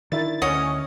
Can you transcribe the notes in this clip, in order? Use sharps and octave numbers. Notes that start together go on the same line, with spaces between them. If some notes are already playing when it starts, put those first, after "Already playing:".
D#3 D4 E4 A#4 A6
D2 C#4 D#5 F#5 C#7 F7